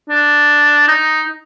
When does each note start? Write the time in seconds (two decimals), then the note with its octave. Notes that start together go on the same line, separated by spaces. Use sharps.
0.10 D4
0.88 D#4